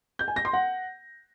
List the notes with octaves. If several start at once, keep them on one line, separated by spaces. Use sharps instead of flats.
G6
G#5
A#6
C6
F#5